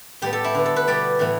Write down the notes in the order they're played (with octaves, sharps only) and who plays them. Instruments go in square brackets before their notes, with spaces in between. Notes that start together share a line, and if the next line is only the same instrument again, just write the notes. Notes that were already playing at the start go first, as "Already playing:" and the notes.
[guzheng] A2 G3 B3 G4
A4
E4
D3 B3
A4
B4
B2 G3 B3 D5
A2 E3 B3